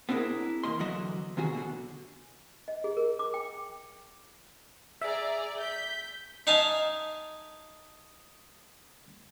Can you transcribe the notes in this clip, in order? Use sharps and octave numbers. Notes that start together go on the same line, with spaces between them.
B3 C4 D4 E4 G#4 A#4
E2 G2 A#3 D#5 C6
E2 D3 F#3 F#4 D#5 E5
D2 C3 D#3 F#4 G#4
B2 D3
D#5
G#4
A#4
D6
G5
G#4 D5 E5 A#5
G6 B6
D#4 E5 F5 G#5 A5